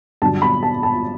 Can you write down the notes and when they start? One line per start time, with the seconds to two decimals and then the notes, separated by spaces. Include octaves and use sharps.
0.22 G2 D3 F#3 A5
0.42 B5
0.63 A5
0.83 A5